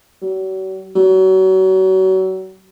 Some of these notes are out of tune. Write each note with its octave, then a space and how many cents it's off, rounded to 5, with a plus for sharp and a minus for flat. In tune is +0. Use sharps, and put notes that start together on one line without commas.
F#3 +40
F#3 +35